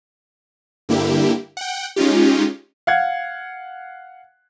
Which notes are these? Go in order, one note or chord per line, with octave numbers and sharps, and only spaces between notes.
G2 D3 A#3 E4 G4
F#5 G5
G#3 C#4 D#4 F4 G4
F5 F#5 G#6